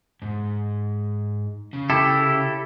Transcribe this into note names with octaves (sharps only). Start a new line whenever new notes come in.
G#2
C#3
E4 G4 A4